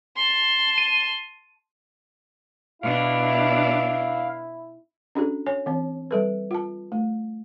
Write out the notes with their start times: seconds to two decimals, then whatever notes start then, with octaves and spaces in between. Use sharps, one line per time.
0.16 A5 C6
0.78 D#7
2.83 B2 D4 E4 F5
5.15 C#4 D4 F#4 A4
5.46 C#5 G#5
5.66 E3 C4
6.11 G3 A4 B4
6.51 F4 A5
6.92 A3